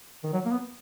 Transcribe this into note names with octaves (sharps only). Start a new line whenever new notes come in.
D#3
F#3
A#3
B3